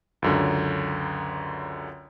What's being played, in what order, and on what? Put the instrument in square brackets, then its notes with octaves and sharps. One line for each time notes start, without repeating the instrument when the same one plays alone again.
[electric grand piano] C#2 F#2 D3